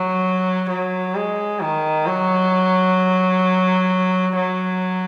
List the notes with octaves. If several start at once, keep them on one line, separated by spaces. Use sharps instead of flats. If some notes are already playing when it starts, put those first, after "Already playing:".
Already playing: F#3
F#3
G#3
D#3
F#3
F#3